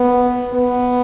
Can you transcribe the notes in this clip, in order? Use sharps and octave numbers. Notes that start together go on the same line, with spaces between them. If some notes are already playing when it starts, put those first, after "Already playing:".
Already playing: B3
B3